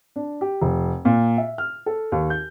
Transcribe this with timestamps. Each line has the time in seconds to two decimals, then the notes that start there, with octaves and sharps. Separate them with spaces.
0.16 D4
0.41 G4
0.62 F1
1.05 A#2
1.38 E5
1.58 F6
1.86 A4
2.12 D#2
2.30 G6